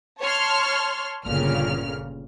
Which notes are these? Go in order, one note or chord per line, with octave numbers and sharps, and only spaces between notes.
C#5 A5 C6 F6
G1 A#2 C#3 F6